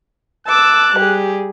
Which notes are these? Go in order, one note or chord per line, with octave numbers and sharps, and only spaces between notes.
A5 D6 E6 F#6
G3 G4 G#4